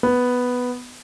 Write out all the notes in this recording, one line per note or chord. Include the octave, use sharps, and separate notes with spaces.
B3